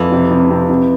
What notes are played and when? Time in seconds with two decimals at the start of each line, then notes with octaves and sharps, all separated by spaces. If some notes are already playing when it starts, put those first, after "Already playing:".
Already playing: F2 E3
0.12 C3
0.31 C3
0.50 C3
0.69 C3